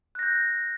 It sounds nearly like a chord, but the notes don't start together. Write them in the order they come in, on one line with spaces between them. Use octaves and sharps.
F#6 A#6 G6